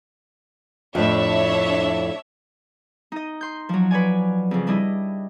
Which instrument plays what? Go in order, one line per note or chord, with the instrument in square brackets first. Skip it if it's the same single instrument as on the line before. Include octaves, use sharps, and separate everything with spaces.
[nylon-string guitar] F2 A2 [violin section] D4 C#5 E5
[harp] D#4 D#5
C6 G6
F3 F#3
B4 C#5 D5 G#5
F2 C#3
G3 D4 E4 D#5